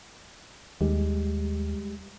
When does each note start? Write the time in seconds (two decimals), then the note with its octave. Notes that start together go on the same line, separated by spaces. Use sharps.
0.81 D#2 G3 G#3 G4